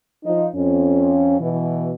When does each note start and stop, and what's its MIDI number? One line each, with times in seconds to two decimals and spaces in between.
0.25 0.46 53
0.25 0.46 63
0.55 1.38 41
0.55 1.38 61
1.40 1.92 47
1.40 1.92 52